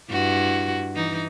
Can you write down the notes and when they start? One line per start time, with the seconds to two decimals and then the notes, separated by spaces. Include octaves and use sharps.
0.10 G2 E4 F#4
0.95 E3 D#4